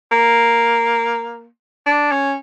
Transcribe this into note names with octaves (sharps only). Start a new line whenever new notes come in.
A#3
D4
C#4